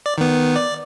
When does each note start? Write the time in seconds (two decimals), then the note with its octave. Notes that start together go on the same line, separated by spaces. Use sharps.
0.06 D5
0.18 D#3 B3
0.56 D5